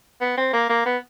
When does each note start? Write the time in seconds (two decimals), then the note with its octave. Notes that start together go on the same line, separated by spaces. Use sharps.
0.21 B3
0.37 C4
0.53 A#3
0.70 A#3
0.86 B3